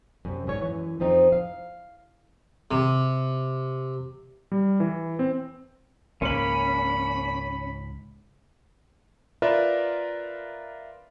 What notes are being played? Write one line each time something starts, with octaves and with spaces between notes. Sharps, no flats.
F#2 C3
G#2 C#5
F#2 E3
F2 F3 C4 D#4
F5
C3
G3
E3
C4
C#2 G#2 A#3 C#4 B5 F#7
F4 A#4 B4 D5 E5